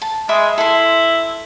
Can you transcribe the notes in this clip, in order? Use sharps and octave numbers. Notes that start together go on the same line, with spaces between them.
A5
G#3 E5 B5 D6
E4 A4 C6